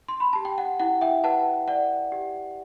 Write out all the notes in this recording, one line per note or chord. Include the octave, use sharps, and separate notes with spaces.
C6
B5
G4 A5
G5
F#5
E4 F#5
E5 G5
B4 F#5 A5
D5 F#5
G4